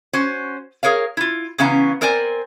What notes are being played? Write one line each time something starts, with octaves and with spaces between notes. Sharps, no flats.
C#4 F#4 C5
G#4 A#4 C#5 F5
E4 F4
C#3 E3 B3 C#4 F5 A#5
C4 A#4 C5 D5 G#5